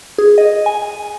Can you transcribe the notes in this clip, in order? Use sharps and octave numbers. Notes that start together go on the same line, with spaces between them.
G#4
D#5
G#5